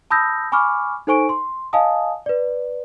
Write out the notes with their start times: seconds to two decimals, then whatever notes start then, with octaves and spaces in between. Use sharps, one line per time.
0.10 A5 B5 D#6 E6 G6 A#6
0.52 G#5 B5 C#6 D6 F6
1.07 D#4 A4 C5 G#5 C#6 D7
1.29 C6
1.73 D#5 F5 G#5 A5 D#6
2.26 B4 D5